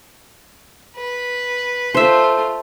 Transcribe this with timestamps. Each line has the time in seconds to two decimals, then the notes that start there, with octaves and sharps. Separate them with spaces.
0.96 B4
1.94 A3 F4 C5 E5